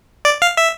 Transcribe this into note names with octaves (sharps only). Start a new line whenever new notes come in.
D5
F5
E5